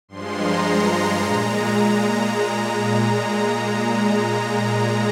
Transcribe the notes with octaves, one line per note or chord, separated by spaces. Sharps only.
G2 F3 G#3 C6
A#5
A#5
A#2 G#3